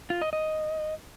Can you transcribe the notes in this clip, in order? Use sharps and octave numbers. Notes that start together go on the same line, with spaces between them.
F4
D#5
D#5